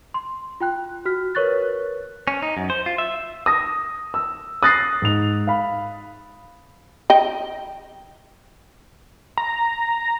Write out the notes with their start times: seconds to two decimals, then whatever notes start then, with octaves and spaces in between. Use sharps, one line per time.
0.14 C6
0.60 F4 G5 F#6
1.05 F#4 F6 B6
1.35 A#4 B4 C#5 C#6 F#6 A6
2.28 C#4
2.43 D#4
2.57 F#2
2.70 C5
2.86 F4
2.98 E5
3.46 D#6 A#6
4.14 E6
4.63 D#6 F#6 A6 A#6 C7
5.02 G#2 F7
5.47 F5 B5
7.10 D#5 G5
9.37 A#5